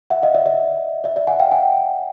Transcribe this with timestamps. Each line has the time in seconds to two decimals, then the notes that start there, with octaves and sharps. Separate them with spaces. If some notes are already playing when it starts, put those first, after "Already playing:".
0.10 E5 F#5
0.23 D#5 F5
0.35 D5 E5
0.46 D5 E5
1.04 D5 E5
1.16 D5 E5
1.27 F#5 G#5
1.40 F5 G5
1.52 F#5 G#5